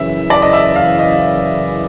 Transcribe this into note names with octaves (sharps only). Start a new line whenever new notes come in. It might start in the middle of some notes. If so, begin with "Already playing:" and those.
Already playing: F#2 C#3 E3 E5
D5
D#5
E5
F5
D#5